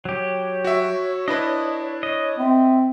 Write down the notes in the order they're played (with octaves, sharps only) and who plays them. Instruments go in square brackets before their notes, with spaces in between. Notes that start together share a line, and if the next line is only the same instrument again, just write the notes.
[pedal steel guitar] F#3 G4 [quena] C#5
[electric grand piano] F#4 E5
[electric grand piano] D4 E4 B4 [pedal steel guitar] D#5
[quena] C#5 [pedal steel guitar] D#5
[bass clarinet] C4 [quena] E5